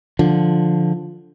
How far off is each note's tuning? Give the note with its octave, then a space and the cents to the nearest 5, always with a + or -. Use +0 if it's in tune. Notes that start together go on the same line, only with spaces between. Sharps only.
D3 +0 F3 +0